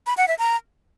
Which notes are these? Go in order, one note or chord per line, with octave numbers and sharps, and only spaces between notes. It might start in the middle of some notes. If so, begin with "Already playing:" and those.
B5
F#5
E5
A#5